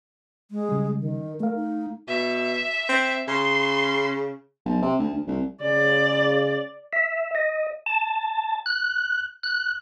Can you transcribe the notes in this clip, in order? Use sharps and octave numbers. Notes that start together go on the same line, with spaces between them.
G#3
C#3 G3
D#3
A3 A#4 F5
D#4
B2 E5
C4
C#3 C6
B1
C3
D2
D2
C2
C#3 D5
E5
D#5
A5
F#6
F#6